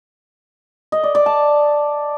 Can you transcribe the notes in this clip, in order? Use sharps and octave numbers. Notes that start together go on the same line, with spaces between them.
D#5
D5
D5
A5